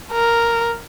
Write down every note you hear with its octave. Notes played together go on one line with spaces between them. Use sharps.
A#4